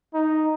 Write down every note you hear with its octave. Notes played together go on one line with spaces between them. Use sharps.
D#4